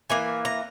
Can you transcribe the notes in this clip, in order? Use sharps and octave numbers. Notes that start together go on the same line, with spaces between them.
E3 A#3 G#5
A#5